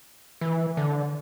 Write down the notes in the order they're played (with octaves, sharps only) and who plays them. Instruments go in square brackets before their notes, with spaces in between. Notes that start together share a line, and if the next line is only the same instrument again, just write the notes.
[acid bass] E3
D3